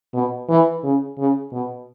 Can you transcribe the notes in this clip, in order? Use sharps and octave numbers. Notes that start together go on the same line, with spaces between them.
B2
E3
C#3
C#3
B2